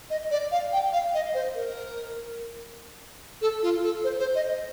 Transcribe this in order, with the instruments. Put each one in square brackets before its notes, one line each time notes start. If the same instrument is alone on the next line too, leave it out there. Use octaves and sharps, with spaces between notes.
[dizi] D#5
D5
F5
G5
F5
D#5
C5
A#4
A4
F4
A4
C5
C5
D#5